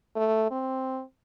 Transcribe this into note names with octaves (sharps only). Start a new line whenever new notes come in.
A3
C4